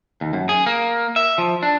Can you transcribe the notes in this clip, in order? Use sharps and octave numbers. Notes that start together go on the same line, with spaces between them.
D#2
F#2
G#4
A#3
E5
F3
D4